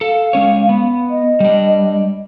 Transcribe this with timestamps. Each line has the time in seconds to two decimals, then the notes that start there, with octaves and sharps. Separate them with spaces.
0.01 A4 F5
0.33 G#3 C#4 C#5
0.69 B3
1.10 D#5
1.40 G3 D4